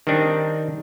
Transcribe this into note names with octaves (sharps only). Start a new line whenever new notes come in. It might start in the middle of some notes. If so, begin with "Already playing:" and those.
D#3 G3 C4 D4 D#4